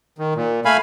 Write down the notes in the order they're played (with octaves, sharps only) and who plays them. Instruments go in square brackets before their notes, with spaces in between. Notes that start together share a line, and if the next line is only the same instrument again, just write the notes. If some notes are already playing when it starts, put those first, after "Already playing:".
[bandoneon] D#3
A#2
A3 F5 G#5 B5